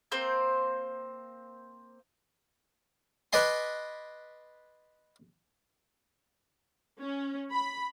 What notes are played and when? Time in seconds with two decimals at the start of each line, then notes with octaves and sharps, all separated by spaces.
0.12 A#3 C4 C5 G6
3.33 B4 D5 D#5 G#5 C6
7.01 C#4
7.52 B5